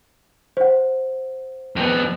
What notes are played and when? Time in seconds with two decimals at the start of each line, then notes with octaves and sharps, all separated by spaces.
0.57 C5 F#5
1.76 F2 B3